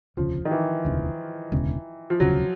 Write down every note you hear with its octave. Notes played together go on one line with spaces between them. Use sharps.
E1 D2 C#3 F3
D#3
E3
E1 D2 C#3
E1 D2 C#3
F3
E1 D2 C#3 F#3